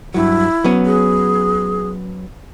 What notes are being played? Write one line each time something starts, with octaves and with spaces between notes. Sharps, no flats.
G2 F#3 E4
F#3 B3 C#4
G#4